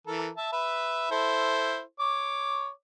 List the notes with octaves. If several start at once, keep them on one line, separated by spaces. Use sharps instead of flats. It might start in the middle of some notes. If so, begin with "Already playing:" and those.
E3 A4 A#4
E5 A5
B4 E5
E4 A4 C5
C#5 D6